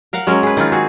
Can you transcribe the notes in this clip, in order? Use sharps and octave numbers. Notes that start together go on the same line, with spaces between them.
A#4 F5 F#5
F#3 G#3 C#4 A#4
G#4 B4
D#3 C4 F4
C4 F#4 G#4